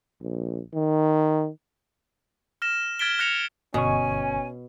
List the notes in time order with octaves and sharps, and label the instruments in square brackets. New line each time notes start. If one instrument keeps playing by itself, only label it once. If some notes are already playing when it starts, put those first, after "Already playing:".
[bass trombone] A#1
D#3
[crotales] F6 A#6 E7
F6 G#6 A6 B6 D7 G7
F6 F#6 A#6 C#7 F7
[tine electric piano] G1 C#6 [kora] B2 [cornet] C#4 [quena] G#5